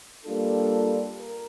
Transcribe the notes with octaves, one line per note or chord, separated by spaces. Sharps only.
G3 A#3 D4 F4 A4
A#4